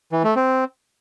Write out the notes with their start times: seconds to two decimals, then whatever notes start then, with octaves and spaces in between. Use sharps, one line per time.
0.12 E3
0.24 A3
0.36 C4